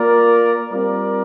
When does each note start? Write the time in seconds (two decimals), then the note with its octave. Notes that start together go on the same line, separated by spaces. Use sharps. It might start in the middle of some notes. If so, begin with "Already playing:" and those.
Already playing: A#3 F4 A#4 D5
0.71 G3 C4 F4 A#4 D5